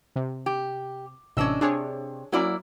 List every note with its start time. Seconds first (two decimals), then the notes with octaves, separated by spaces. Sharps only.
0.16 C3
0.46 G4
1.37 A1 C3 C#4 D4 D#5 E6
1.61 C3 D4 G#4 C#5
2.32 F#3 A#3 C#4 E4 D5